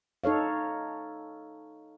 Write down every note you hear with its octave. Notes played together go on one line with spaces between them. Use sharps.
D#4 A4 C#5 F5